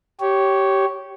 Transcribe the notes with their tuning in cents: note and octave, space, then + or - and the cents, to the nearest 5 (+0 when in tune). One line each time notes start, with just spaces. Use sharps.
G4 -15 C#5 +0